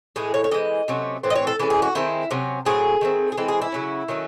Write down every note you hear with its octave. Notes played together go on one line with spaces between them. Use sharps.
A2 E3 G#3 G#4
C#5
C#5
E3 G#3 C4 D#5
C3 F#3 A3 C#4
A2 E3 C4
D#5
C#5
A4
E3 G#3 C#4 A4
G#4
F#4
D#3 G#3 C4 E4
C3 F#3 C#4
A2 F#3 C4 G#4
D#3 A3 C4
G#4
E3 G#3 C4 A4
G#4
E4
C#3 F#3 C#4
D#3 F#3 A3 C#4